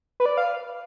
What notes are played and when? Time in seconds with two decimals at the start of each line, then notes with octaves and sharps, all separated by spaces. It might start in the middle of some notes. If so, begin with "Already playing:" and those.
0.20 B4
0.26 D5
0.37 F5